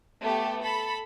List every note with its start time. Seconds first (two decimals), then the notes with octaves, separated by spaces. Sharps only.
0.22 A3 B3 G4 A4
0.61 A4 B5